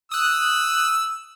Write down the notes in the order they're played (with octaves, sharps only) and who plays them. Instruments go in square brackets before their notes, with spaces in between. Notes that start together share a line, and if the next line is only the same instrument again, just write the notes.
[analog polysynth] D#6 F#6 [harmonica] E6